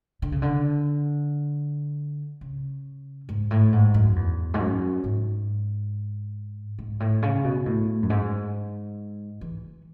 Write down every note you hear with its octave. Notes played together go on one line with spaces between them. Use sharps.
D3
C#3
D3
C#3
G#2
A2
G#2
F#2
E2
G#2
F#2
G#2
G#2
A2
C#3
B2
A2
F#2
G#2
E3